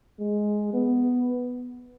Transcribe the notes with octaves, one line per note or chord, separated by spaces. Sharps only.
G#3
B3